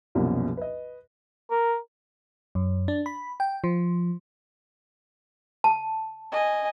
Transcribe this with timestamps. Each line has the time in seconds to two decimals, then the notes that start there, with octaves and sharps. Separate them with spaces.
0.15 C2 F#2 B2 F3 G3 A#3
0.57 B4 D#5
1.51 A#4
2.55 F#2
2.88 D4
3.06 B5
3.40 G5
3.64 F3
5.64 A5
6.32 D#5 G#5